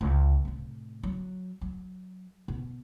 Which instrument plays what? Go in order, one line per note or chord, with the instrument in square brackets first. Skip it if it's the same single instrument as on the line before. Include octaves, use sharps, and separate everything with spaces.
[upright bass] C#2
A2 C3
F#3
F#3
B2